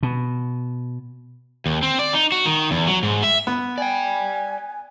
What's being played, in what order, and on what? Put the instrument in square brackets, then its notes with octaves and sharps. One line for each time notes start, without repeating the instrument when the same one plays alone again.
[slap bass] B2
[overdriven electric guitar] D#2
C4
D5
D#4
F#4
D#3
E2
F#3
G#2
E5
[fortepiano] B3
[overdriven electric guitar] D5 G5 [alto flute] G#5